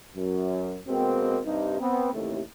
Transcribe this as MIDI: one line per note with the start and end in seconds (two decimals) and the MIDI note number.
0.15 0.78 42
0.88 1.39 47
0.88 1.39 56
0.88 1.39 58
0.88 1.39 60
1.44 1.79 43
1.44 1.79 48
1.44 1.79 63
1.80 2.13 59
1.80 2.13 60
2.13 2.40 33
2.13 2.40 39
2.13 2.40 45
2.13 2.40 48
2.13 2.40 57